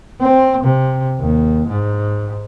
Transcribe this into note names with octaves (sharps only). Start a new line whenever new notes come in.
C4
C3
D#2
G#2